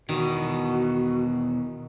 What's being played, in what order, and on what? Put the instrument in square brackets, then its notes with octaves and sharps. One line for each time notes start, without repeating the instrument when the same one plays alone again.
[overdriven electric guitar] E2 B2 [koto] D#3 [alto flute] F#4